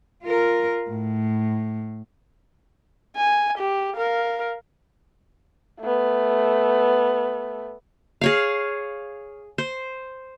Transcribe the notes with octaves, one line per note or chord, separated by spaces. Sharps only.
F4 A#4
A2
G#5
G4
A#4 F5
A3 B3
G#4 C#5 F5
C5